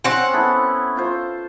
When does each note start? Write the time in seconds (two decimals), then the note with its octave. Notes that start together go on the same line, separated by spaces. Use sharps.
0.04 C4 C#4 F#5
0.33 B3 E4 A4
0.97 F4 C5